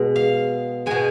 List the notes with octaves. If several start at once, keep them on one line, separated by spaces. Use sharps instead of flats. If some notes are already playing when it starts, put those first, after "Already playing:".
Already playing: B2 G#3
F5
B2 G#3 G#5